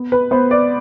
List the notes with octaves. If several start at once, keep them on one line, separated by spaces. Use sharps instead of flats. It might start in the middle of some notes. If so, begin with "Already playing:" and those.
Already playing: B3
B4
B3 C5
D5